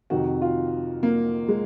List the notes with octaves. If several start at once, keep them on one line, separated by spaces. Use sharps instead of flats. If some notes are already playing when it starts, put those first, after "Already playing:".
F2 C3 D#3 F#4
F4
A#3
G#3